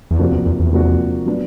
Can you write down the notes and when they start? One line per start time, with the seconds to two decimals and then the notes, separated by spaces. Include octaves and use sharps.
0.11 E2
0.19 F2 C3 F3 A#3 D4 F#4
0.32 E2
0.46 E2
0.60 E2
0.73 C3 F3 A#3 D4 F#4
1.26 F#3 B3 D4